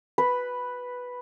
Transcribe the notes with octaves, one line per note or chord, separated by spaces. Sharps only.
B4